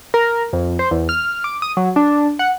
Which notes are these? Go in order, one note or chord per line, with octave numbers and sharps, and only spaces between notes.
A#4
F2
C5
E2
F6
D6
D#6
F#3
D4
F#5